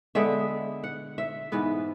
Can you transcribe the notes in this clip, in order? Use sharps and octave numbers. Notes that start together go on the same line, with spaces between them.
D3 G#3 B3 E5
F#5
E5
G#2 E3 B3 B4